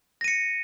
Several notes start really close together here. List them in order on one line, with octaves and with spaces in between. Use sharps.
A#6 D#7 C#7